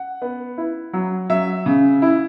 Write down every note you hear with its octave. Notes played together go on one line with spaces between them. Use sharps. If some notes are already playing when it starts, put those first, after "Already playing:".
Already playing: F#5
B3
E4
F#3
F#3 E5
C#3
E4